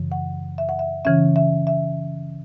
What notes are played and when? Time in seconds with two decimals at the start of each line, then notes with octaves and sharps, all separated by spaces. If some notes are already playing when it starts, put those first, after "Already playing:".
Already playing: F#2 C#3 E3
0.12 F#5
0.58 E5
0.69 F#5
0.79 E5
1.05 C#3 E3 C#4 E5
1.36 E5
1.67 E5